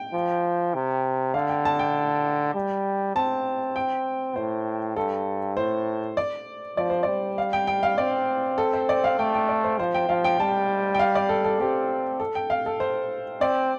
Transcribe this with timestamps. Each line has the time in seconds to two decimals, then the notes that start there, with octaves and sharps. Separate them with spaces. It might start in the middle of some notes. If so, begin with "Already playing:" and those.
Already playing: G5
0.14 F3
0.74 C3
1.34 D3 F5
1.49 G5
1.65 A5
1.79 G5
2.55 G3
3.16 C4 A5
3.76 G5
4.36 A2 C5
4.96 G2 A4
5.57 A2 C5
6.17 D5
6.77 F3 D5
6.90 C5
7.03 G3 D5
7.38 F5
7.53 G5
7.67 G5
7.83 F5
7.98 C4 D5
8.58 A4
8.73 C5
8.89 D5
9.04 F5
9.19 A3 G5
9.34 G5
9.48 D5
9.64 C5
9.79 F3 C5
9.94 G5
10.09 F3 F5
10.24 G5
10.40 G3 A5
10.95 G5
10.99 F5
11.15 D5
11.29 A4
11.44 A4
11.60 C4 G4
12.20 A4
12.35 G5
12.50 F5
12.66 A4
12.80 C5
13.41 C4 D5